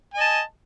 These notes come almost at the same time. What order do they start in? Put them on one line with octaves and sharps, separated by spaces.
G#5 D#5 A5